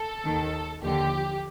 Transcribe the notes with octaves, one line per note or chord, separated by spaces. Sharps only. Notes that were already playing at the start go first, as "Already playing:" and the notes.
Already playing: A4
D#2 D#3
D#2 D3 F3 G4